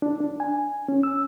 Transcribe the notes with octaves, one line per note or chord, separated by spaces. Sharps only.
D4
D4
G#5
C#4
E6